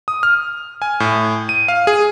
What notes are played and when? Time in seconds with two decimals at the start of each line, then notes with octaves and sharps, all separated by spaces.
0.08 D#6
0.23 F6
0.82 G#5
1.00 A2
1.49 D#7
1.68 F5
1.87 G#4